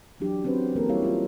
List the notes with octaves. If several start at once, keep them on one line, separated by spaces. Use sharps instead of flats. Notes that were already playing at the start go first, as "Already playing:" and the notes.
E3 F#3 D4 G4
C4 C#4 F#4 B4 C5
E3 A#3 A4 A#4
G3 A#3 E4 G4 C#5 F5
D#4 F4